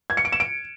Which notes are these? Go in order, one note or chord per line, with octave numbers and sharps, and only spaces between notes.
G#6
C#7
D7
E7
D7